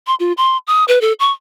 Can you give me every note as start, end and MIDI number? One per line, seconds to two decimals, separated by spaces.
0.07 0.15 84
0.20 0.33 65
0.37 0.57 84
0.67 0.84 87
0.88 1.01 71
1.01 1.13 69
1.20 1.32 85